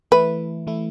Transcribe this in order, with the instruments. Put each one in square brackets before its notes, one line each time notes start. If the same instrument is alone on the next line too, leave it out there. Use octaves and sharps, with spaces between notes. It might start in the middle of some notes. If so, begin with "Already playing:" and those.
[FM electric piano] E3 A3 E4 [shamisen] B4
[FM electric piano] E3 A3 E4